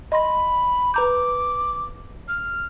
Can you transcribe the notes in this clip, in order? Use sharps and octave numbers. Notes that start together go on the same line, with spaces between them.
D#5 B5 C6 A#6
B4 A#5 D6 G6
F6